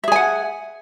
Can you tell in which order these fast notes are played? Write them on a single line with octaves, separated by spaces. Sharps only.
E5 G#4 G#5 F#5